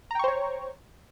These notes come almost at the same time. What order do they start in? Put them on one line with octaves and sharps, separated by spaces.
A#5 G5 C#6 C5 C#5